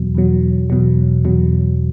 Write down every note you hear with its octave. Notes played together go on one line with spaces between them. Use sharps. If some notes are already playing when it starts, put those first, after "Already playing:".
Already playing: E2 B2 F#3
E2 B2 F#3
E2 B2 F#3
E2 B2 F#3